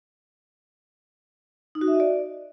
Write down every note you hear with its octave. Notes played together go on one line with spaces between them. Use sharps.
D#4
F#4
E5
D#5
D5